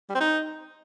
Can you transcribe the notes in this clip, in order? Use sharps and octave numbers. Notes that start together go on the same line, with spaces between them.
G3
C4
D#4